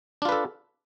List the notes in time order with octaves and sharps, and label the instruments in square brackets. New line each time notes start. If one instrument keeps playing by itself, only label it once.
[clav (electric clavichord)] D4
F4
B4
A4